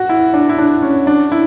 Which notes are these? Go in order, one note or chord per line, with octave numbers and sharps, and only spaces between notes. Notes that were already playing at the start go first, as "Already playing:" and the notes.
Already playing: F#4
E4
D4
E4
D4
C#4
D4
E4